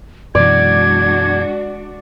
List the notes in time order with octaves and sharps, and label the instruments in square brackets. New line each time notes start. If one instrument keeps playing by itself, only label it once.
[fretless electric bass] F#2 B2 E3 [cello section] G#3 D4 F#4 [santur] D5 [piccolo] G#6